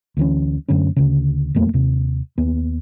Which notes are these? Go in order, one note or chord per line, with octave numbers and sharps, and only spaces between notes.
D2 E3 C#4
F#2 D3 A3 C#4
D2 C#3
D#1 F2 A3 A#3
D#2 C3
D#2 B3